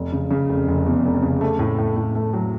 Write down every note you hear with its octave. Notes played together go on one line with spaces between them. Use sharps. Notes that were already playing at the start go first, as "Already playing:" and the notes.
Already playing: F1
C#3
C#3
F1
F1
E2
F1
C#3
A3
A2
A2
A2
A3
F#3